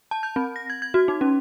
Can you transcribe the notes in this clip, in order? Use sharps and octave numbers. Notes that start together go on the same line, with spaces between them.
A5
G6
C4
A#6
G#6
G#6
F#4
D#4
C#4